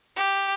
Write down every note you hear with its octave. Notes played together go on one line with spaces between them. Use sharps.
G4